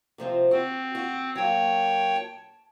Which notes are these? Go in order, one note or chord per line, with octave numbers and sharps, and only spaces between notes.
C3 F3 C4
C4 F#4
F#4
F#3 A#3 C#5 G5
A5